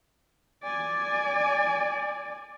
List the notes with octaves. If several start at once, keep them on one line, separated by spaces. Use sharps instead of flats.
D5 G#5